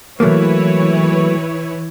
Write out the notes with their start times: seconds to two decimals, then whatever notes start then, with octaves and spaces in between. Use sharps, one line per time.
0.20 E3 F#3 A3 A#3 E4 B4 C#5